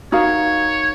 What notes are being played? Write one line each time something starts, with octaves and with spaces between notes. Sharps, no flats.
D#4 F#4 A#4 C#5 F5